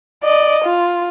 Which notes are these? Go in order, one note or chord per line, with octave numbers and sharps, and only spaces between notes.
D5 D#5
F4